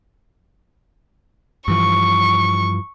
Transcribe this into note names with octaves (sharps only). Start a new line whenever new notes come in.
G2 E3 F3 C#6